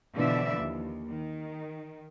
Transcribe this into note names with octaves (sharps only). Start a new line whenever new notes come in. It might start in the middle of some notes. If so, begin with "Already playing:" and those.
B2 D3 E3 F3 D5 E5
D#2
D#3